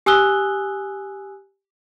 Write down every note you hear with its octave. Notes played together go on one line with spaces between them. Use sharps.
G4 G#5 D#6 E6 F#6 G7